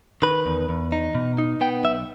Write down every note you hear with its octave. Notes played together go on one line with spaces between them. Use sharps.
D#3 B4
E2
E2
D#4
B2
D#4
B3 G5
B1 E5